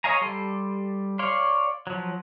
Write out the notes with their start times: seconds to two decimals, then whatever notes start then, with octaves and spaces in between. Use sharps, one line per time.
0.04 C#5 D#5 F5 G#5 A#5
0.21 G3 A4 C6
1.19 C#5 D5 F5 C6
1.87 F3 F#3